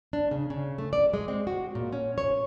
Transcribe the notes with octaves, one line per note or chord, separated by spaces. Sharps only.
D4
C#3
C#3
A3
D5
G#3
C4
F#4
A#2
C#4
C#5